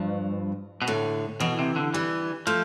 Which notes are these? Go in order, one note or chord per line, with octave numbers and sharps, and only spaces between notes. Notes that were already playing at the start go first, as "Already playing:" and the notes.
Already playing: G2 F3
B2
A2 D3
B2 E3
C3
D3
E3 G3
F3 A3